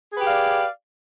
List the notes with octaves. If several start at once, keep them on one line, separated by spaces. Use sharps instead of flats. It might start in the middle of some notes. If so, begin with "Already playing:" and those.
G4 G#4 B4 D5 F5